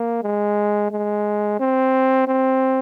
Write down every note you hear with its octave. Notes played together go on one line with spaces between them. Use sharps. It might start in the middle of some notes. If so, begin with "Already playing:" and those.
Already playing: A#3
G#3
G#3
C4
C4